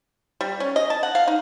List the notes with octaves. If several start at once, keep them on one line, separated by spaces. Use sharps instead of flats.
G3
C#4
D#5
A5
F#5
F5
D#4